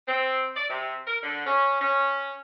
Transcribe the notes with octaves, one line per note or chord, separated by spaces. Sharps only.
C4
D5
C3
A#4
D3
C#4
C#4